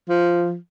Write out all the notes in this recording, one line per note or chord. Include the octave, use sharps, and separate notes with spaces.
F3